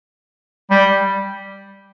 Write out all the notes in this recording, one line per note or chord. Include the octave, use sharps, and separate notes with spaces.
G3